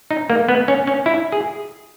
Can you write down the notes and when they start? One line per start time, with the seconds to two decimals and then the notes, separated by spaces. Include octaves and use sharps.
0.11 D#4
0.30 A#3
0.49 B3
0.68 C#4
0.87 C#4
1.06 E4
1.32 G#4